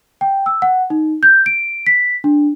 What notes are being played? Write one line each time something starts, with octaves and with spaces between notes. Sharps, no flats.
G5
E6
F#5
D#4
G6
D7
B6
D4